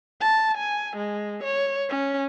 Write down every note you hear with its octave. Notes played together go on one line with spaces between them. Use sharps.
A5
G#5
G#3
C#5
C#4